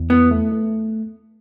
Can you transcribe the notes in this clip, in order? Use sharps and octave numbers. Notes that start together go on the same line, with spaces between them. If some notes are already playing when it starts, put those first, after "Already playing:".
Already playing: E2
B3 E4
A3
A3